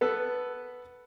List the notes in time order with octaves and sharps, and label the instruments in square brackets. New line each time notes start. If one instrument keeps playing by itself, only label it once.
[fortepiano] B3 A4 B4